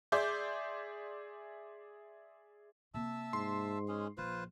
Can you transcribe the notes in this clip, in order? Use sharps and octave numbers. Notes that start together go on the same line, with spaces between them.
G#4 D5 E5 C6 D6 G6
C3 A#3 E5 A5 E6
G#2 C6
G#3 C#4 G#4
A#1 F3 F4 B4 C5